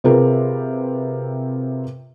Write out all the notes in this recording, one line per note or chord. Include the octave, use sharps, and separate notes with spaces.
C3 C4 F4 G#4 A#4 B4